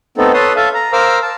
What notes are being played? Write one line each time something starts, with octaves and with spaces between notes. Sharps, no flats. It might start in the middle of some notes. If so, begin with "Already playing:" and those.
A3 B3 C4 D#4 A4
A4 B4 C#5 A5 C6 D#6
A4 E5 F5 A5
A#5
A#4 C5 F5 D6 E6 F6
A5